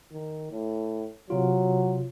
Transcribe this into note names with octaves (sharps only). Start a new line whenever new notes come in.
D#3
A2
C3 F#3 F4